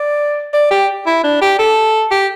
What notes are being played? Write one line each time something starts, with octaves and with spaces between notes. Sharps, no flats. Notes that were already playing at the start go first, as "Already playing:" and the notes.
Already playing: D5
D5
G4
E4
D4
G4
A4
G4